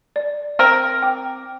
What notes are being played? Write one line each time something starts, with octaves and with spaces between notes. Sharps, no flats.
D5
C4 A#4 F6
G5 D6